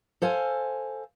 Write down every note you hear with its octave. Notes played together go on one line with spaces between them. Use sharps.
A4 C5 F5 G#5